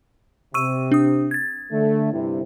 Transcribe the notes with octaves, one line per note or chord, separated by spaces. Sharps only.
C3 C#6 E6 D#7
D4 D#6
G#6 A6
D3 A3
G1 C3 E4